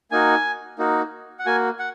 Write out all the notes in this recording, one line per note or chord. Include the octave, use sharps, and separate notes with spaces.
A#3 D#4 F#4 G#5
A#3 D#4 F#4
F#5
A#3 F#4 G#5
F#5